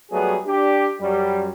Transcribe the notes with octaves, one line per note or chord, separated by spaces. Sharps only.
F#3 G3 A3 B3 G#4
D4 G4
F#2 G3